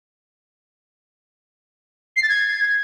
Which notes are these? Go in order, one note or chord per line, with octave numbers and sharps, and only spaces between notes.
C7
A6
G#6